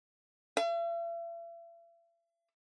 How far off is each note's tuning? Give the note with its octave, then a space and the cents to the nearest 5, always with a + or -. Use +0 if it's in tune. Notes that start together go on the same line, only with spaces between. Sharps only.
E5 +45